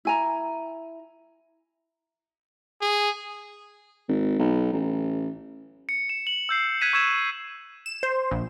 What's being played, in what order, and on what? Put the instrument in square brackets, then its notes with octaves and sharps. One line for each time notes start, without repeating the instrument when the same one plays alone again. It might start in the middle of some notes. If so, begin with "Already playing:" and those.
[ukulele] E4 G#5 A#5
[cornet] G#4
[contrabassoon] G#1
B1
A1
[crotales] C#7
E7
F#7
E6 G6 C7
F#6 G#6 B6 D#7 E7
C#6 E6 G#6 E7
[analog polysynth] E7
C5
A#1